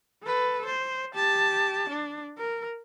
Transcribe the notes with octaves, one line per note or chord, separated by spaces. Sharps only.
A4 B4
C5
G4 A5
D4
A#4